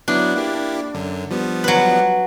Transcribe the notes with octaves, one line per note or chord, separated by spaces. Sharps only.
F#3 B3 D4 E4
A#3 E4 G4
F#2 D3
F3 G3 B3
F#3 B4